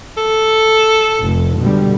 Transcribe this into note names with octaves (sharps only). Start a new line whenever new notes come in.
A4
F1
B2 D3 G3